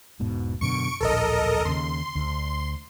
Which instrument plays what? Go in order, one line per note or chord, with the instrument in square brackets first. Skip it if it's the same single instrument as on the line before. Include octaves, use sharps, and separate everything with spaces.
[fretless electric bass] E1 G#2 B2
[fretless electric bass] F#2 B2 D3 [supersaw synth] C#6 C#7 D7
[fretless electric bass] D1 A#1 [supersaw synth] A4 A#4 D#5
[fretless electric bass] D#2 C#3 [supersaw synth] C6
[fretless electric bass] D2